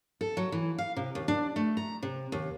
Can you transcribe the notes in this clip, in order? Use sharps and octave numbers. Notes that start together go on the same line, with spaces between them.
A4
F#3
E3
F5
C3
D#2
D4
A3
A#5
C3
D#2